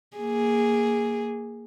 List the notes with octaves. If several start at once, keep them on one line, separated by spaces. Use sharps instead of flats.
A#3 G#4